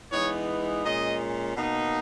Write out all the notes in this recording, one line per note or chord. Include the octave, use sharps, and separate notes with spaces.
E3 G#3 B3 D#4 C#5
A#2 G#3 C#4 D#5
B2 A#3 D#4